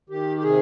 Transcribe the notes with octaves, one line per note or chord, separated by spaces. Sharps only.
D#3 G4
G4
C3 G#4